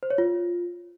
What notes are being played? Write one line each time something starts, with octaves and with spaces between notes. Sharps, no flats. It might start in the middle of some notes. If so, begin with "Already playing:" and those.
C5
C#5
F4